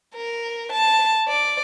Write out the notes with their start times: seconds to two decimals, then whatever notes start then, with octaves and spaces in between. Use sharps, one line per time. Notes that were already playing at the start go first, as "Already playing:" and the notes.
0.15 A#4
0.72 A5
1.28 D5